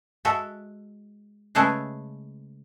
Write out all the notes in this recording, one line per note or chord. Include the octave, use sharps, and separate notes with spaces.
G#3 F#4 A4 E5 F#5
C#3 G#3 A3 G#4 A4 B4